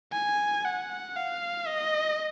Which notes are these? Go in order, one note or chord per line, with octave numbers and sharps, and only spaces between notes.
G#5
F#5
F5
D#5